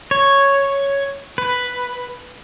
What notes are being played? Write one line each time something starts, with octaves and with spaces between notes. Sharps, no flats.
C#5
B4